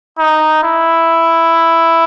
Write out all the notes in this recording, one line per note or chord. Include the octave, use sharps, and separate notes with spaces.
D#4
E4